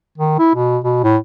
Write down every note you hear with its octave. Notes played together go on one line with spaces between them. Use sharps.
D#3
E4
B2
B2
A2